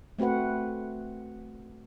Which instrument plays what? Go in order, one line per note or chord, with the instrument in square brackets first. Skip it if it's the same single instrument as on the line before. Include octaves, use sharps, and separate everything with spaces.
[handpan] A3 C4 F#4 B4 F#5